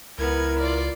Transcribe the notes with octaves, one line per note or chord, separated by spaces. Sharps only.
C#2 B3 E4 A#4 G#6
F4 D5